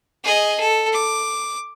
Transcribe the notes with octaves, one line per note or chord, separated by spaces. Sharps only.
G#4 D#5
A4
D6